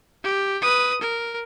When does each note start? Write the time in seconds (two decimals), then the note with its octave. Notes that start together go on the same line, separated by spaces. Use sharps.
0.24 G4
0.62 B4 D#6
1.01 A#4